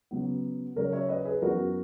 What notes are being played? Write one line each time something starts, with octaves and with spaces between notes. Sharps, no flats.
C#3 F#3 B3
C#3 F#3 C#4 A#4 C#5
C#5 E5
B4 D#5
G#4 B4
F#2 E3 B3 F#4 A#4